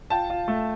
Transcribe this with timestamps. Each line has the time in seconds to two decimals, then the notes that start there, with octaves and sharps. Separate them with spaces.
0.10 F4 G5 A5
0.30 F4
0.48 A3